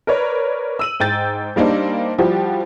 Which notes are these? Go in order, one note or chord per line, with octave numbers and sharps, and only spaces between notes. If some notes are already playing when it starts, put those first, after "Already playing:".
A#4 B4 C#5 D5
E6 D#7 F#7
G#2 G5 G6 A6
G3 A#3 D4 D#4 C5
F3 G3 E4 F#4 G4